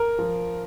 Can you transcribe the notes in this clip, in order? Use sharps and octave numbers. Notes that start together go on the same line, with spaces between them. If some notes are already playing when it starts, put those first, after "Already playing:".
Already playing: A#4
F3